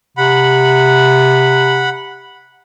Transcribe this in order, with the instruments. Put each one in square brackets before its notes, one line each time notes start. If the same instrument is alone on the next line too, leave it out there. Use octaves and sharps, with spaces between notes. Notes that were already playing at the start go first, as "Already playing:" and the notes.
[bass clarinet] C3 [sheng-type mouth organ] F#5 B5